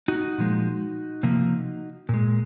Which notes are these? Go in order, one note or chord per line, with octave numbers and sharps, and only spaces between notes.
D#4 F#4
A#2 F3 G#3
C3 F3 A#3
A#2 G#3